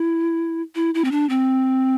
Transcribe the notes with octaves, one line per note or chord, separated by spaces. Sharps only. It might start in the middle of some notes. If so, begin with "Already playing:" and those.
Already playing: E4
E4
E4
C4
D4
C4